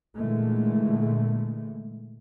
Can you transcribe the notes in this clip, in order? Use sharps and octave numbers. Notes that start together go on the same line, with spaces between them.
A#2 D3 E3 G#3 A3